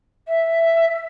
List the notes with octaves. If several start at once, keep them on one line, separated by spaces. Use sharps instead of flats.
E5